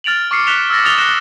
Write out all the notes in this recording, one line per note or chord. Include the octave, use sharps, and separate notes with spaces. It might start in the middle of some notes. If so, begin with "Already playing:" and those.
F6 A6 D7 F7 F#7
C#6 D6 F6 C7 C#7
F#6 B6 C#7 E7 F7 G7
E6 F6 A6 A#6
D#6 A6 F7 G7
F#6 A#6 C#7 E7 G7